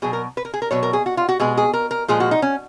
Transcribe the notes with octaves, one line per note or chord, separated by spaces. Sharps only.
B2 F#3 G#4
A#4
B4
A#4
G#4
A#4
B2 F#3 C#5
A#4
G#4
F#4
F4
F#4
B2 G#3 G#4
G#4
A#4
A#4
A#2 F3 G#3 G#4
F#4
D#4
C#4